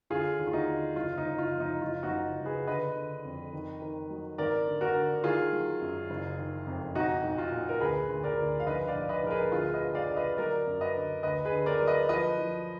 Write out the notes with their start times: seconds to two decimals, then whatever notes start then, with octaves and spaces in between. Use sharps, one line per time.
0.10 D3 F4 G#4
0.39 D#2
0.47 F4
0.53 D#4 F#4
0.67 D3
0.96 F#1 F4
1.18 D#4
1.25 F#1
1.38 F4
1.53 F3
1.60 D#4
1.82 F#1 F4
2.03 D#4 F#4
2.10 F#1
2.39 F#1
2.45 G#4 B4
2.67 D3 B4 D#5
2.96 D3
3.25 F2
3.53 D#3
3.82 D#3
4.10 F#3
4.38 G#1 A#4 D5
4.67 D3
4.81 F#4 A#4
4.95 D3
5.24 D#3 F4 G#4
5.52 F#3
5.81 F#2
6.10 F#1
6.38 D#3
6.67 F2
6.95 B1 D#4 F#4
7.24 B1
7.38 F4
7.52 A#2
7.69 A#4
7.80 D2 G#4 B4
8.09 D2
8.24 A#4 D5
8.38 D2
8.60 F5
8.67 A#1 B4 D#5
8.87 D5 F5
8.95 A#1
9.09 B4 D#5
9.24 A#1 A#4
9.31 G#4 B4
9.52 D2 F4 G#4
9.74 B4 D#5
9.81 D3
9.95 D5 F5
10.09 D3
10.16 B4 D#5
10.37 F#3 A#4 D5
10.67 F#2
10.81 B4 D#5
10.94 D3
11.23 D2 B4 D#5
11.45 G#4 B4
11.52 D3
11.66 A#4 D5
11.81 F#3
11.87 B4 D#5
12.09 F3 B4 D#5
12.38 F3